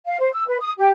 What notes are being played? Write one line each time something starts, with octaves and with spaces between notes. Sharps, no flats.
F5
C5
E6
B4
D#6
G4